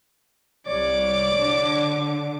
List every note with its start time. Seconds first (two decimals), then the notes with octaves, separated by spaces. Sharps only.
0.67 C2 C#5 D5 D6
1.33 D3